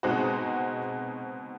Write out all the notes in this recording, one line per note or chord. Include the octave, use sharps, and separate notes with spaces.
B2 G#3 C4 D#4 F#4